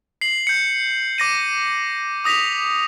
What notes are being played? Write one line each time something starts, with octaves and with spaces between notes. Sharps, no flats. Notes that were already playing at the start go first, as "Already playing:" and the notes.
C7 F#7
G6 C#7
D6 A#6 D#7
D6 D#6 A#6 B6 F7